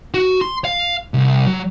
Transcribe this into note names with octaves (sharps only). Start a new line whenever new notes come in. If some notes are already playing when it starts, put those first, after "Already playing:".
F#4
C6
F5
C2
F#3